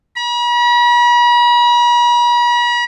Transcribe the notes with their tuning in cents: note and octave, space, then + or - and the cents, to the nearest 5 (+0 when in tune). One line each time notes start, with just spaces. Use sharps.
B5 -45